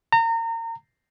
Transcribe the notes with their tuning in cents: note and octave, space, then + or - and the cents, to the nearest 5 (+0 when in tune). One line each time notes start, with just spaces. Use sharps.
A#5 -30